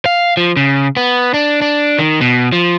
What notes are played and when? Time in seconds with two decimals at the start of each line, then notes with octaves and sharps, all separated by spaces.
0.06 F5
0.37 F3
0.57 C#3
0.97 B3
1.34 D4
1.62 D4
1.99 D#3
2.21 B2
2.52 F3